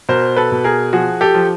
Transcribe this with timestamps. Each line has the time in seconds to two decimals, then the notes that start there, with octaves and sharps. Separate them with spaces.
0.09 B2 A#4 C5
0.36 A4 B4
0.52 B2
0.64 G#4 A#4
0.93 F3 F#4 G#4
1.21 G4 A4
1.34 F3